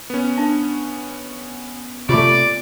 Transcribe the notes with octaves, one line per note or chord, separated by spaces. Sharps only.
B3 C#4
D4
C3 A3 F4 D5 B5 D6